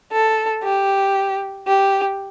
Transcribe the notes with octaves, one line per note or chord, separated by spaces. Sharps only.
A4
G4
G4